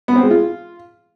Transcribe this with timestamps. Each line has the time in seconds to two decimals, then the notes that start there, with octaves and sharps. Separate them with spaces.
0.08 B3
0.16 C4
0.23 G#3
0.31 F4